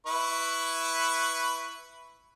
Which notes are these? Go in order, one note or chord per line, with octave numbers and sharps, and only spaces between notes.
E4 B4 C#6